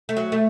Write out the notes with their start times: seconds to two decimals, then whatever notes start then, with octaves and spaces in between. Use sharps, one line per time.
0.09 A3
0.17 F#3
0.32 A3